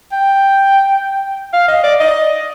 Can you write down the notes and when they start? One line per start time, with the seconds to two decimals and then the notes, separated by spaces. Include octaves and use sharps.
0.12 G5
1.54 F5
1.68 D#5
1.84 D5
2.00 D#5